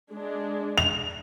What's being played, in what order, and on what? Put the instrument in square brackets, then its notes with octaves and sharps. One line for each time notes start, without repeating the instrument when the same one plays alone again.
[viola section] G#3 D4
[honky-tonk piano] F7